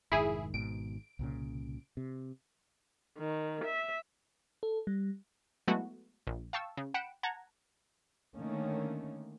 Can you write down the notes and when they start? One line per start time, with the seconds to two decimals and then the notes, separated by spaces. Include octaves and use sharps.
0.12 F1 G#2 D#3 E4 G#4
0.54 G#1 G#2 B2 D7
1.19 C2 A#2 C#3
1.97 C3
3.18 D#3
3.65 E5
4.63 A4
4.87 G3
5.68 F#3 G#3 A3 B3 E4 F#4
6.27 A#1
6.53 F5 G5 A5 C#6 E6
6.77 C#3
6.94 F#5 G5 B5 C#7 D7 E7
7.23 F#5 A5 A#5 G#6
8.35 D3 D#3 A3 A#3 C#4